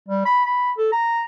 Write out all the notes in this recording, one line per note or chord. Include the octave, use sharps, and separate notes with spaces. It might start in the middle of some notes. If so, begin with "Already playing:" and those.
G3
B5
B5
A4
A#5